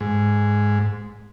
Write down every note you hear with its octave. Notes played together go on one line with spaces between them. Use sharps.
G#2